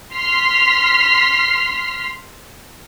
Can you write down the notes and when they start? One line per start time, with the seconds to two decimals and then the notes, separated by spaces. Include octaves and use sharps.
0.15 C6 F6 B6 C7